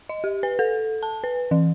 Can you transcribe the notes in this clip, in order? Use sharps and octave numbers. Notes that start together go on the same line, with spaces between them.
D#5
G4
B4
A4
A5
B4
E3